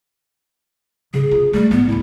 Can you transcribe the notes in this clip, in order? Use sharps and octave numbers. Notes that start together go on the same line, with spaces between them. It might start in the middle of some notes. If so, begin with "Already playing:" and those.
C#3 G#4
F4
G3 A3
A1 B3
D2 C#4 E4